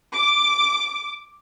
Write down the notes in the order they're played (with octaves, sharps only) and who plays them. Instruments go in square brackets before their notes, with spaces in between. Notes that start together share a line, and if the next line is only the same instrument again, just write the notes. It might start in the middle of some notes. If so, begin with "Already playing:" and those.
[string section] D6